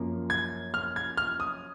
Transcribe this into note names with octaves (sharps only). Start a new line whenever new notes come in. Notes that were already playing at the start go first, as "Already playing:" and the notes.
Already playing: F#2 F3 A#3
G#6
F6
G#6
F6
D#6